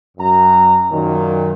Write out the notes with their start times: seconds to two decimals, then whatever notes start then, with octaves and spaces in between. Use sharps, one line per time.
0.18 F#2 A#5
0.91 F#2 A#2 D#3